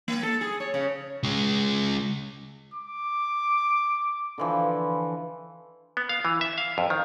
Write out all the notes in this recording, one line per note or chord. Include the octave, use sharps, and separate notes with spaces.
A#3
A4
G#4
C#5
C#3
C#3 G#3
D6
D3 E3 F3
B3
F5
E3
E5
F5
F2
D#3